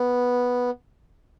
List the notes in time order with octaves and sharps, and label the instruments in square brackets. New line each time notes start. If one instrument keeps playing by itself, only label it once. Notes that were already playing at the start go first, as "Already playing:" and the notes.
Already playing: [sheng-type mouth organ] B3